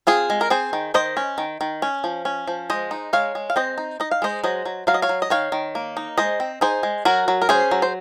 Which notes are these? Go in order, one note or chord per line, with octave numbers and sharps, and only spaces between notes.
C4 F4 G#4
G#3
A#4
C4 G#4 C5
D#3
D#3 C5 D#5
C#4
D#3
D#3
C#4
F3
C#4
F3
G#3 C5 D#5
D#4
G#3 C#5 F5
G#3
F5
C4 C5 D#5
D#4
D#4 D#5
F5
G#3 C5 D#5
F#3 C5 D#5
F#3
F#3 F5
D#5
C#5 F5
F#3
D#5
D#3 C#5 F5
D#3
A#3
D#4
G#3 C5 D#5
C4
D#4 G#4 C5
G#3
F#3 F#4 A#4
F#3
A#4
C#4 G#4 C5
F#3
C5